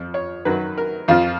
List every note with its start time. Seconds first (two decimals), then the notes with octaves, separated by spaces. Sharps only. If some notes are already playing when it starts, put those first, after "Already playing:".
Already playing: F2 F3
0.14 C#5
0.45 F#2 D#3 F#3 B4
0.78 A#4
1.08 F2 F3 F4